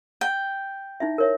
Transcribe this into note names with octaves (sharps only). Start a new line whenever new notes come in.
G5
D#4 E4 E5
A#4 C#5 E5